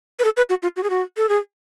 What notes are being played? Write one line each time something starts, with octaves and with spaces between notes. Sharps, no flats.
B4
A4
B4
F#4
F4
F#4
G#4
F#4
A4
G#4